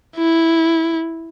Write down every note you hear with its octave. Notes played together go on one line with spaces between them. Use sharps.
E4